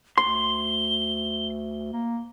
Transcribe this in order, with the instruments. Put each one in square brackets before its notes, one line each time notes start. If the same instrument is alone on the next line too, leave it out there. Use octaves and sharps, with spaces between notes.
[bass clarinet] D2 [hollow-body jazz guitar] C6 [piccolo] G7
[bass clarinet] A#3